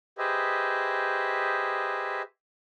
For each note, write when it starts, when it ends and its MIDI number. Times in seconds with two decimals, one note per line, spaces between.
0.18 2.22 67
0.18 2.22 68
0.18 2.22 71
0.18 2.22 72
0.18 2.22 75
0.18 2.22 76